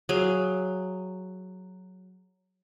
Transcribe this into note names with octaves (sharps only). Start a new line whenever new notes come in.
F#3 G#4 F5